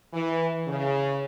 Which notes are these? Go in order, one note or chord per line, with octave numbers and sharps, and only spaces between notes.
E3
C#3